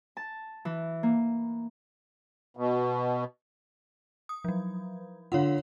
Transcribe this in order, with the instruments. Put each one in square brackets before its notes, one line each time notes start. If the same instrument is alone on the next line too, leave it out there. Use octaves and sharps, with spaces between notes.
[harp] A5
E3
A#3
[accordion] B2
[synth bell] D#6
F3 F#3
[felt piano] D3 F4 [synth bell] C#5 F5 F#5